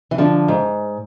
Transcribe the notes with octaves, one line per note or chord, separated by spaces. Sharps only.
E3
D3 F3
G#2